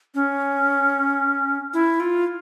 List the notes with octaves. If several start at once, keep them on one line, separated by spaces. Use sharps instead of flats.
C#4
E4
F4